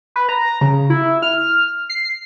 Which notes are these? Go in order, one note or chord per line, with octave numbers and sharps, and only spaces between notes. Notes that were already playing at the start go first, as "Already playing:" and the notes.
B4
A#5
C#3
E4
F6
C7